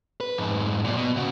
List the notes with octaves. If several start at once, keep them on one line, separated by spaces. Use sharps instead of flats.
B4
F2 G#2
B1 A#2
B2
C#3 F#4